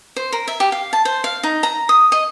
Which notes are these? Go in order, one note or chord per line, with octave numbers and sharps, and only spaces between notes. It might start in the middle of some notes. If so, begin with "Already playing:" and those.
C5
A#4
E5
G4
F5
A5
C5
F5
D#4
A#5
D#6
D#5